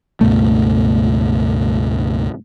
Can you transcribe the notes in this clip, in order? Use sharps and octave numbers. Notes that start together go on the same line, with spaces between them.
C#2 G2 B2 A3